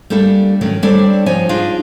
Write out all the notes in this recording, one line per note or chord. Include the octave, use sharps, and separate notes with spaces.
G3 A3 A#3 D4 A4
D#3 F#3 A3 C#4
G3 C4 D4 A4 C#5 D5
F3 D#4 C#5 G#5
D4 D#4 F4 G#4